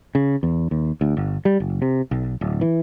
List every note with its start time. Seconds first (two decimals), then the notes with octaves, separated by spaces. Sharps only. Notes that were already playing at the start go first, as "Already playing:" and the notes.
0.15 C#3
0.43 E2
0.71 D#2
1.01 D2
1.17 G1
1.45 G3
1.60 F#1
1.82 C3
2.11 B1
2.41 D1
2.61 E3